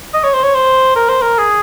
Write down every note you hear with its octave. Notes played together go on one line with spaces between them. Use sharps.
D#5
C#5
C5
C#5
C5
A#4
C5
A#4
G#4